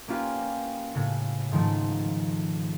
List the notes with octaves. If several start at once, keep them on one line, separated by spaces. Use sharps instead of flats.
A#3 C#4 F4 G4 B4 F5
A2 C#3
G#2 D#3 F3 A3